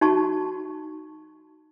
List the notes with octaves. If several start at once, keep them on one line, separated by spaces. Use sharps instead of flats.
D#4 F#4 A5 C#6